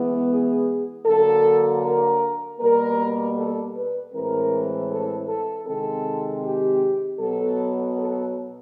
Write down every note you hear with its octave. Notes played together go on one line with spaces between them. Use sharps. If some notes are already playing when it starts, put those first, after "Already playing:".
Already playing: E3 G#3 B3
G#4
D3 F#3 A#3 A4
A#4
B2 G3 A#3 A#4
A4
B4
A2 E3 G#3 C4 A#4
A4
A4
C3 D#3 G#3 C4 A4
G4
B2 F#3 B3 A4
A4